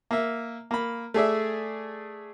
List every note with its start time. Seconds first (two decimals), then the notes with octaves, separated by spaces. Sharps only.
0.11 A#3 E5
0.71 A#3 B5
1.14 A3 G#4 D5 E5